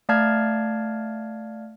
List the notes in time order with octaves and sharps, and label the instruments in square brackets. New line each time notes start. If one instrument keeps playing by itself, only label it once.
[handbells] A3 D5 F5 A5 F6 G#6